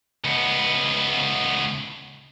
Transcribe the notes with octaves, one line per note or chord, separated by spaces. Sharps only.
C#2 B3